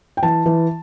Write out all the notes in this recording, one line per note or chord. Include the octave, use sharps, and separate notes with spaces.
G5
E3 A5
E3